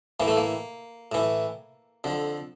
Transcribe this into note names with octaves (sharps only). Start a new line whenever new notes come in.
A2 E3 A#3
A3
A#3
A2 E3
F2 D3